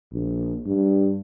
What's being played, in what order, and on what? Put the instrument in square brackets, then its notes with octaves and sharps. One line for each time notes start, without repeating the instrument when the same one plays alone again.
[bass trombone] A#1
G2